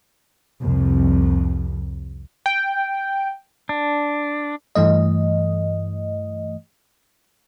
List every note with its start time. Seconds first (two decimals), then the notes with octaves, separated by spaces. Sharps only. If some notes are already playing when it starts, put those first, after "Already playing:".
0.60 C2 F2
2.46 G5
3.69 D4
4.75 G2 E3 A3 D#5